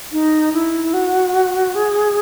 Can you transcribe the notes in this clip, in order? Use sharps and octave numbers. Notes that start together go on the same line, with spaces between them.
D#4
E4
F#4
G#4